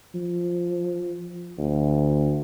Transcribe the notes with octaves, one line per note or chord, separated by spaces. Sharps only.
F3
D2